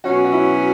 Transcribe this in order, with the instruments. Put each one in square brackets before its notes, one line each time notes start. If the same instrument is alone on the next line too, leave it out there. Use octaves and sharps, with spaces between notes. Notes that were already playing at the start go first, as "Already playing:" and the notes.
[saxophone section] B2 F#3 C#4 [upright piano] F#4
[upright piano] F#4
E4